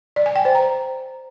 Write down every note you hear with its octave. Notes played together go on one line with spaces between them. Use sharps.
D5
G#5
G5
C5
A#5